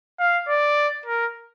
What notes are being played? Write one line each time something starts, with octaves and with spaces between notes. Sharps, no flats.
F5
D5
A#4